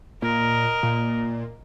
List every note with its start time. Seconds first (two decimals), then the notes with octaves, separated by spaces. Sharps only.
0.22 A#2 A#4 D#5
0.83 A#2